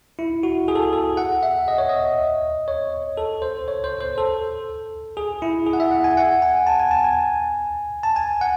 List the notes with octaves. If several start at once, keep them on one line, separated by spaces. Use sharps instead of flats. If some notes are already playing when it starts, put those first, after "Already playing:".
E4
F#4
G#4
A4
G#4
A4
F#5
E5
D#5
C#5
D#5
C#5
A4
C5
C#5
C5
C5
A4
G#4
E4
G#4
F#5
E5
F#5
G#5
F#5
G#5
A5
G#5
A5
G#5
A5
G#5
F#5